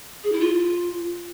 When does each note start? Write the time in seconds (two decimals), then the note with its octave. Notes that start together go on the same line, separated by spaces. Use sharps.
0.24 G#4
0.32 E4
0.40 F4